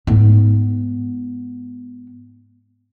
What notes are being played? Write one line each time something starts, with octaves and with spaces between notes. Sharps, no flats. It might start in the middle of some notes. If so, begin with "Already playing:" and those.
G#2 B3